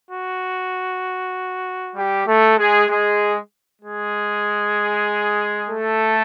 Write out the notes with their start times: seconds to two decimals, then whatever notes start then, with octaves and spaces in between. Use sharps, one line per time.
0.10 F#4
1.96 G3 G4
2.27 A3 A4
2.58 G#3 G#4
2.89 G#3 G#4
3.82 G#3 G#4
5.69 A3 A4